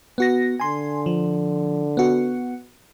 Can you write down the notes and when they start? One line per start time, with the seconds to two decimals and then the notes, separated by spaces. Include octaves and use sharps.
0.18 B3 F#4 A#6
0.60 D3 G#5 C6
1.06 F3
1.97 B3 F#4